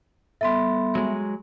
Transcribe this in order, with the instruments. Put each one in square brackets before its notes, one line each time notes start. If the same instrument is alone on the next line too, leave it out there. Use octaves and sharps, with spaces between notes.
[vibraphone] G3 B3 A4 [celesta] E5 C6
[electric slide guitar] F#3 G#3